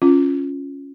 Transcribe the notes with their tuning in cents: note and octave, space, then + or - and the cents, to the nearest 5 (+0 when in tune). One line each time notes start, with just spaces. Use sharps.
C#4 +0 F4 +0